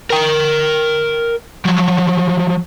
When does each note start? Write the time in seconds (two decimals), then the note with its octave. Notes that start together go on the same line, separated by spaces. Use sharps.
0.10 A#4 G5
1.65 F3 F#3